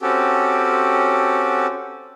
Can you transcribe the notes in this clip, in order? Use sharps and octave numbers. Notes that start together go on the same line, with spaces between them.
C4 C#4 F#4 G4 A4